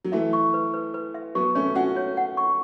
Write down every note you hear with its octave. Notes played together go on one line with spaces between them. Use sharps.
F#3
E3 A3 E5
C#6
B4
B4
B4
E5
F#3 B3 C#6
A3 C#4 C#5
C#4 F#4 F#5
C#5
F#5
C#6